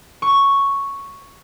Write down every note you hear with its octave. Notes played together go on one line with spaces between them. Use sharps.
C#6